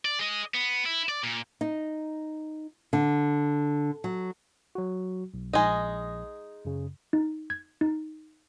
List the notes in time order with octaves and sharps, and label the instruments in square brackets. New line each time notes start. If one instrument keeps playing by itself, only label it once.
[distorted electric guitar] D5
G#4 D#5
B3
E4
D5
A#2
[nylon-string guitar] D#4
D3
F#3
[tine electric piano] F#3 F#4
B1
[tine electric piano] A#1 [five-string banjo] G#3 D#4
[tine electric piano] F#2 C#3
[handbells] D#4
G#6
D#4